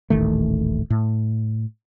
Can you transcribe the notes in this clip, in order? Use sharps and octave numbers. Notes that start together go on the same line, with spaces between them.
D#1 A1 D#3 A3
A2